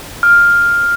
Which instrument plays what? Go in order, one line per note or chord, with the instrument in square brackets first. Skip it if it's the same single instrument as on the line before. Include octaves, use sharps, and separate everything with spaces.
[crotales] F6